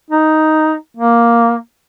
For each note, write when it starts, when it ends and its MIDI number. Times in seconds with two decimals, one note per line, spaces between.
0.10 0.75 63
0.97 1.56 58